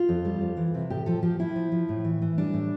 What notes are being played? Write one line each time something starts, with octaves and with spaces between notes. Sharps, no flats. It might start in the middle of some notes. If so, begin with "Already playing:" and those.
Already playing: F4
F2
G3
F2
E3
C3
A2 G4
F3 A4
F3 G4
F3 E4
F3
F3
A2
E3
E3
G3 D4
A2